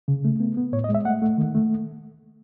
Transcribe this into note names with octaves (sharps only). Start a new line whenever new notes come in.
C#3
A3
B3
B3
A2 C#5
D#5
G#3
E5
A3 F#5
A3
D#3
A3